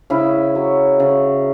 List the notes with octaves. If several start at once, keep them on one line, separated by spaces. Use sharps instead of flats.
C#3 E4
F#3
C#3